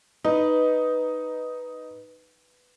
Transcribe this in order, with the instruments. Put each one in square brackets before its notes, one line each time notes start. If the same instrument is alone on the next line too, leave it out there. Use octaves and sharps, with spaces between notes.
[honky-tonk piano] D#4 [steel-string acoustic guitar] B4